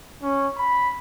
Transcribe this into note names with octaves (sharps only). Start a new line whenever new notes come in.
C#4
B5